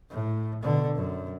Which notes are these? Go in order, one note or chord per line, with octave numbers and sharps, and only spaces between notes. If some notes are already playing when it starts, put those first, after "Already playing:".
A2
B2 D3
F#2